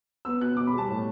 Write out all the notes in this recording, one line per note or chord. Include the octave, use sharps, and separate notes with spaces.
B3 E6
B2 F#6
B2 D6
B5
G3 A5
A2